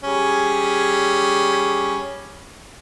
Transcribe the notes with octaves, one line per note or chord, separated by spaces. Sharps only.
G3 C#4 G#4